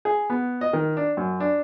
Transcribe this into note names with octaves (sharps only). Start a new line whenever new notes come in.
G#4
B3
D#5
D#3
D4
F#2
D4